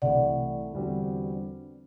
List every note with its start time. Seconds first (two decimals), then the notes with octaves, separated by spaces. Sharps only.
0.02 C2 C3 E3 A3 E4 D5 F#5
0.73 E2 D3 G3 C4 F#4